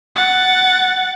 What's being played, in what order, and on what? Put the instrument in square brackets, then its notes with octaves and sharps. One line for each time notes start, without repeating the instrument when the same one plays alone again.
[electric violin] F#5 A6